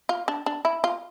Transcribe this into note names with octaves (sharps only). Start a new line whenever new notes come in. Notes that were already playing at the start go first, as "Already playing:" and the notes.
F4
D4
D4
E4
F4